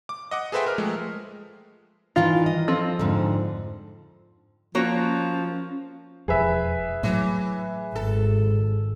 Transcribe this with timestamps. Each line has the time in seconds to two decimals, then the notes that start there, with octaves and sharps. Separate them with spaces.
0.09 D6
0.31 D#5 F#5 D6
0.52 G#4 A4 B4 C5 E5 G5
0.66 A#4 B4 F6
0.78 F3 G#3 A3
2.16 G2 D#3 E3 F4
2.46 D#5
2.68 F3 C4 A4
2.99 F2 G#2 D3
4.75 F3 A#3 C#4 F#4 C#5
6.28 E1 F2 G#4 B4 E5
7.03 A2 E3 F#3
7.95 G#1 A4